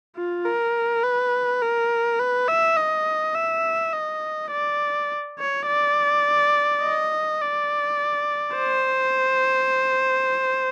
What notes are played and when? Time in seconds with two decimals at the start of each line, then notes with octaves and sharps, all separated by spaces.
0.17 F4
0.46 A#4
1.03 B4
1.62 A#4
2.19 B4
2.48 E5
2.77 D#5
3.35 E5
3.93 D#5
4.51 D5
5.38 C#5
5.67 D5
6.83 D#5
7.41 D5
8.57 C5